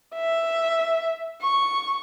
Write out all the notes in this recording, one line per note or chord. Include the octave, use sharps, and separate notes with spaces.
E5
C#6